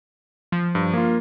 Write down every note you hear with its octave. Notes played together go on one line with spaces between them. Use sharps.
F3
G2
A#3 F4